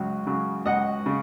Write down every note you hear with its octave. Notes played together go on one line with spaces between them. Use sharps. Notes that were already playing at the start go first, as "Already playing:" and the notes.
Already playing: C#2 C#3 F#3
C#3 F#3
C#2 D#5 F#5
C#3